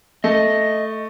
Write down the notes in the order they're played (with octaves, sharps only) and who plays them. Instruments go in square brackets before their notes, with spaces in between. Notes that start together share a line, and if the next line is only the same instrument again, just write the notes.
[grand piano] A3 [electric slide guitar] D#5